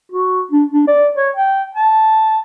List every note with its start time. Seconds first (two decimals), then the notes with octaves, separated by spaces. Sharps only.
0.12 F#4
0.51 D4
0.72 D4
0.88 D5
1.15 C#5
1.36 G5
1.75 A5